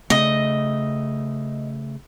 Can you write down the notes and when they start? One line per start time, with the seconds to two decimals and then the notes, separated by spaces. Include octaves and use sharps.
0.10 C#3 A3 D#5